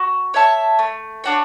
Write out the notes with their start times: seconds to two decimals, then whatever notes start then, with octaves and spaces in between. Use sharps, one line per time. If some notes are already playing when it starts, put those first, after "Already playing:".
Already playing: F#4
0.34 C#5 E5 A5
0.79 A3
1.24 D4 F#4 C#5